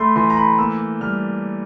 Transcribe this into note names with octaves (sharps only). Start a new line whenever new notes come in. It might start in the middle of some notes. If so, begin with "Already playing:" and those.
Already playing: A3 B5 C6
E3 C6
A#5
B5
A#3 E6
G3 F6